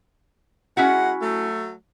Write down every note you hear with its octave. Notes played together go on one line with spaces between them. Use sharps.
G#3 C#4 E4 F#4 F#5
F#3 A3